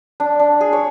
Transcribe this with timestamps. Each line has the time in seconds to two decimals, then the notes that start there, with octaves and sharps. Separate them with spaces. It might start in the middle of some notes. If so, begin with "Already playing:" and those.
0.20 D4
0.39 D4
0.61 G#4
0.73 C#5